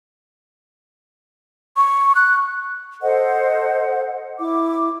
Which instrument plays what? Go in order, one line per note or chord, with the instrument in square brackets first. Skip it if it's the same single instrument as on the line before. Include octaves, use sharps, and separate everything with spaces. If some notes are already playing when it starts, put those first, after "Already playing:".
[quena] C#6
F#6
[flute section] A4 C5 F#5 [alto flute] D#5
[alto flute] E4 [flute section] D6